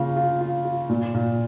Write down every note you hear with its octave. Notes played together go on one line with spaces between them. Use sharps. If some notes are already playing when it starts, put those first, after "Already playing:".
Already playing: C#3 A#3 F4
F4
F4
F4
A#2
A#2